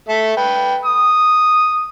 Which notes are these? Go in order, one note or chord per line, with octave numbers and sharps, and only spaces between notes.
A3 A4 E5
B4 G5
D#6